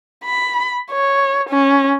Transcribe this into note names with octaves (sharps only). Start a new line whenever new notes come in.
B5
C#5
C#4